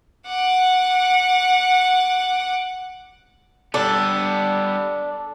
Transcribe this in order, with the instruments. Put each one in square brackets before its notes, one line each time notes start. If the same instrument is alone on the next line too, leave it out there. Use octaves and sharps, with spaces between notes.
[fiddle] F#5 D6
[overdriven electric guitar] G3 B3 [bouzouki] D4 [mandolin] A4